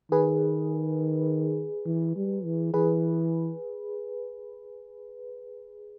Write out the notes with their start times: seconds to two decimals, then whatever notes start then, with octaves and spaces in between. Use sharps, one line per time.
0.11 D#3 G#4 B4
1.86 E3
2.16 G3
2.45 E3
2.74 E3 G#4 B4